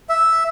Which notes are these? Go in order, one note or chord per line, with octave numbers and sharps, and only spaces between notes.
E5